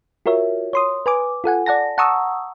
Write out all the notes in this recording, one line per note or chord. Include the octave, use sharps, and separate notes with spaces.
F4 F#4 A#4 C#5 E5
C#5 C6 D#6
B4 G#5 D6
F4 A4 F#5 G#5
D5 F#5 A5 A#6
F#5 A5 A#5 C#6 D#6 E6